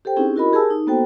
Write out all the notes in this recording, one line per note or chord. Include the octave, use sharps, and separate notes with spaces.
G4 A4 C5 G5
C4 C#4 D#4 E4 G4 G#4
E4 F#4 A#4 D#5 B5
G4 G#4 A#4 G#5 A5 E6
D#4
A#3 B3 F#4 A4 C5 G5